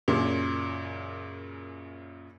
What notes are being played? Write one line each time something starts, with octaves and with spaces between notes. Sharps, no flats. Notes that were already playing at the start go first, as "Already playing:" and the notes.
F#2 A#2 C#3